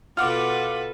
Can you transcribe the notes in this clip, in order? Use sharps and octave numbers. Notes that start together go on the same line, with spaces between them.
B2 F4 A4 B4 F#5 D6 F6